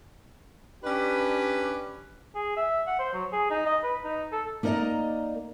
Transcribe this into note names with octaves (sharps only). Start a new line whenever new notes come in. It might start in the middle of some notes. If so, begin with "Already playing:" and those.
C#4 D4 G4 B4
G#4
E5
F#5
C5
F#3
G#4
D#4
D#5
B4
D#4
A4
A#3 D#4 A#4 D5 D#5 A#5